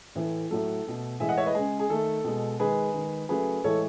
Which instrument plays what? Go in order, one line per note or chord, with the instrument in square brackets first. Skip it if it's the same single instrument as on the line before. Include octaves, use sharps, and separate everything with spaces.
[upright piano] A2 E3 A3
A2 F#3 A3 A4
B2 A3
A2 E3 G#3 E5 G#5
D#5 F#5
C#5 E5
B4 D#5
C#3 G#3 G#4
G#4
D#3 A3 A4
B2 G#3
D#3 G#3 G#4 B4
D#3 G#3
C#3 F#3 A3 G#4 B4
A2 E3 G#3 A4 C#5